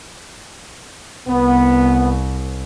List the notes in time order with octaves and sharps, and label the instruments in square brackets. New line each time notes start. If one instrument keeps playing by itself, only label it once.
[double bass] C2 [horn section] B3